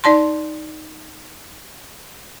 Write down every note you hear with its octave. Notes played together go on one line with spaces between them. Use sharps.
D#4 D5 A5 C6